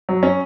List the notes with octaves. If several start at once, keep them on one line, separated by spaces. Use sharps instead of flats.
F#3
C#4